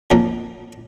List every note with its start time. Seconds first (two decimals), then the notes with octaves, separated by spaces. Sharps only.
0.11 F2 F3 A#3 D#4